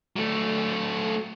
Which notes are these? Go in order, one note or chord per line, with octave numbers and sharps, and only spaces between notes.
F#3 A3